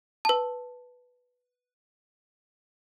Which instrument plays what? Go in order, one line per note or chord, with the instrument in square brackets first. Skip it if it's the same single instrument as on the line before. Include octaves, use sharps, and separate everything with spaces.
[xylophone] B4 A5